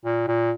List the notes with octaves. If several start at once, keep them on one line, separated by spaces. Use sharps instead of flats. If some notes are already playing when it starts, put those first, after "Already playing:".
A#2
A#2